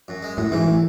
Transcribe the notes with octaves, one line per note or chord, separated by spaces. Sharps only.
F#2
G#3
F#2 A2
G#2 E3
A2